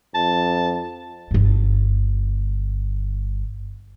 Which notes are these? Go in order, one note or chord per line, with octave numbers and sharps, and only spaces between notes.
F2 A5
G1 G2